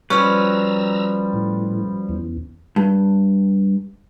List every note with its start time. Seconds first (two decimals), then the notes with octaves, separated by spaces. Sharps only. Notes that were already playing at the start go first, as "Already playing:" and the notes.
0.10 F3 G3 C#4 F#4 B4 A#5 B5 E6
1.33 A2
2.09 E2
2.76 G2